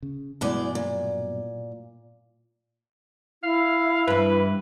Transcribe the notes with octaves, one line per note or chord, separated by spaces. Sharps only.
C#3
E2 G2 B2 F#3 G#3 D5
A#2
E4 F5
G2 E3 B4